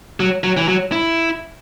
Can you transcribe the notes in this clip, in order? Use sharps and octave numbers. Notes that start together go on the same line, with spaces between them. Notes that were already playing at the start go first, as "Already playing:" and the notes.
F#3
F#3
E3
F#3
E4